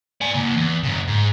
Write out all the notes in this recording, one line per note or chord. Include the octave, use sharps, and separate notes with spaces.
D5 G#5
C#3 A#3
E2
F#2 C#3
G#2